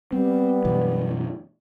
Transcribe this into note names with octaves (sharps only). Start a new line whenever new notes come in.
G3 B3 C4
F#2 B2 E3